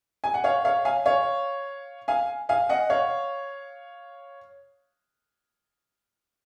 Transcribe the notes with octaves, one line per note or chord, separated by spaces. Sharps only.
G#5
F#5
C#5 F5
C#5 F5
F5 G#5
C#5 F5
F5 G#5
F5 G#5
D#5 F#5
C#5 F5